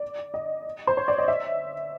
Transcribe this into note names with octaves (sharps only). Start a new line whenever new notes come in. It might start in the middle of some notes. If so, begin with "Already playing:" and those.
Already playing: D5
D#5
C5
C#5
D5
D#5
E5